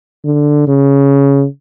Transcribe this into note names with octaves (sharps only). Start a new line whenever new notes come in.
D3
C#3